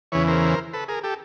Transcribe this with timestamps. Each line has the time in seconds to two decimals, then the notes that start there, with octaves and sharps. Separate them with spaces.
0.12 E2 C#3 E3 B4 C#5
0.27 A#4 C5
0.73 A4 B4
0.88 G#4 A#4
1.03 G4 A4